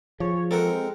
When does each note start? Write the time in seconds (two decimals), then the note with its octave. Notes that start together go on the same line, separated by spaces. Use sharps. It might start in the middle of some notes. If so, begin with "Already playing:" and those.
0.20 F3 G#4 C#5
0.51 G#3 C4 A4 A#4 F#5